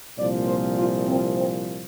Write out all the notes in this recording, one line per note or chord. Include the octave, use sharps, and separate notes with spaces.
C2 A#2 F3 D5
C5
F4
C4
C4